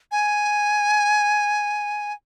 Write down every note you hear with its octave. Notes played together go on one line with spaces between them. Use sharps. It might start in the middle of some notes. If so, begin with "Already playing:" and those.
G#5